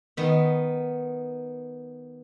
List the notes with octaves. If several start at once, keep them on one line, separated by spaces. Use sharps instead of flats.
D#3 B3